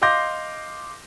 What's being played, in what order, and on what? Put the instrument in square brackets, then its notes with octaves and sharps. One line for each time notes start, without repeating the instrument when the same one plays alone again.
[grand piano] D#5 F5 C6 D6 G6 A#6